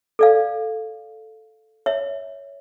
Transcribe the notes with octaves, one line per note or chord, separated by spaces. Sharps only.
A4 D5 F5
C#5 E5